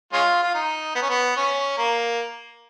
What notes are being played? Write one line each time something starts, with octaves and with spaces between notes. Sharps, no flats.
G#3 C#4 F4
F4
D#4
B3
C#4
B3
C#4
A#3